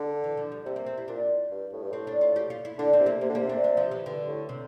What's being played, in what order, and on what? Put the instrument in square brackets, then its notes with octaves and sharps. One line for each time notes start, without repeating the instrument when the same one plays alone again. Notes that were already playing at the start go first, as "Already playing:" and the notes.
Already playing: [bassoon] D3
[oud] E3
F3
G3
[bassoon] C3 [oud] A3
[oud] A#3
C4
E4
[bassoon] A#2 [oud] D4
[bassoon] G2
A2
G2
[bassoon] A2 [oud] C4
[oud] D4
F4
G4
F4
E4
[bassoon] D3 [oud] D4
[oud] C4
[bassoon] C3
[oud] A#3
[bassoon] C3 [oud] A#3
[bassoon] D3
[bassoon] C3 [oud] A#3
[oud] D4
D4
F3
E3
[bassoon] G2 [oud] D3
[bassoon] A2
[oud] C3